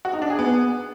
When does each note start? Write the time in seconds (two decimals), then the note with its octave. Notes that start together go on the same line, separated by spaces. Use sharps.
0.05 F#4
0.13 D#4
0.22 D4
0.30 G#4
0.39 B3